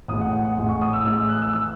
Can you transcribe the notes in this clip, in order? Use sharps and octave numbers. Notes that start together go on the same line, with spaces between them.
A1 A2 G#3 D#6
F#5
F#5
F#5
A1 A2 G#3
C#6
D#6
E6
A1 A2 G#3 E6
E6
F#6
E6
E3 E6